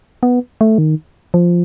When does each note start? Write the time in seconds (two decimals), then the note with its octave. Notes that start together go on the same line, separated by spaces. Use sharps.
0.23 B3
0.61 A3
0.78 D#3
1.34 F3